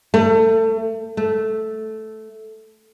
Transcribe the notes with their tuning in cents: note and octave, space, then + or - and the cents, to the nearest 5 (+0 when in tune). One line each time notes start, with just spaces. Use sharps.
A3 +25
A3 -10